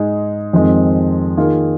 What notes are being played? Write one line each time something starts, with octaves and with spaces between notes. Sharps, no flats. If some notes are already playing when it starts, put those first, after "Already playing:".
Already playing: G#2 G#3 D#4 G#4
F2 D#3 G#3 C4
D#3 A#3 F4 G#4